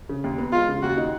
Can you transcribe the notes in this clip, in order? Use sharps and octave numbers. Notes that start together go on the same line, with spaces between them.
C#3
D#2
B3
G#3 F4
C#3
D#2 F#4
D#4